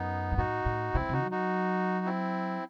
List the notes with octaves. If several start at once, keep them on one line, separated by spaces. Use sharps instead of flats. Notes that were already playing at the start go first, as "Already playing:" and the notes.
Already playing: F#2 B3 D#4
G2
A2 D#4 F#4
A2
C3 C4 E4
D#3
C3 D#4 F#4
F#3
D#4 F#4
C4 E4